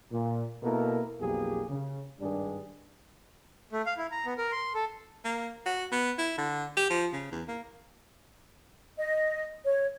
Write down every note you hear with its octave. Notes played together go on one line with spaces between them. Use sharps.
A#2
B2 A#3 E4 A4 A#4
B1 F2 A#3 G4 G#4
C#3
G#1 G2 D#3 G3 D4 G#4
A3
F5
E4
A#5
B3
A#4
C6
A4
A#3
F#4
B3
E4
D3
G4
F3
C#3
E2
A#3
D#5
C#5